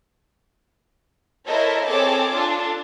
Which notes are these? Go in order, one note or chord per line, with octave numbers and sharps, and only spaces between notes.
E4 A4 A#4 C5 C#5 D#5
C4 G#4 A4 C#5 A5 D6
D4 F4 A4